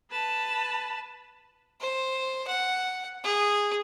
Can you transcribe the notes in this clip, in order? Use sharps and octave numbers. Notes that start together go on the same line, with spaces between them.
B4 A5
C5
F#5
G#4